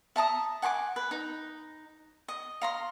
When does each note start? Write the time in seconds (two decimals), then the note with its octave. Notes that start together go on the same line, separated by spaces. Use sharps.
0.16 E5 A5 A#5 D#6
0.62 F#5 G#5 C6 D6
0.96 B4
1.11 D#4
2.28 D#5
2.61 F5 A#5 C6